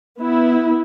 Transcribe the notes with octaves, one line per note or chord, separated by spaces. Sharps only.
B3 E4